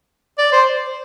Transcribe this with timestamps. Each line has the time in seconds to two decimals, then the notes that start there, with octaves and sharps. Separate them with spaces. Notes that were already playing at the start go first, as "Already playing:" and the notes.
0.38 D5
0.52 C5